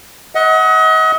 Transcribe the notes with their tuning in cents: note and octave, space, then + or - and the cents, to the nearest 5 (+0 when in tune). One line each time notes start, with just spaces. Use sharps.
D#5 +35 F#5 +0